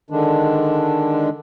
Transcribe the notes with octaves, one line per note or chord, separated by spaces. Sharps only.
D3 D#3 G#3 D4